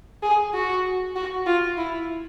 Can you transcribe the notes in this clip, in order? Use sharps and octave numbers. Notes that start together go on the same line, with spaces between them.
G#4
F#4
F#4
F4
E4